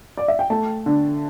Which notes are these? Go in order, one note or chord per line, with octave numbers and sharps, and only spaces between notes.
D5
E5
G5
A3 A5
D3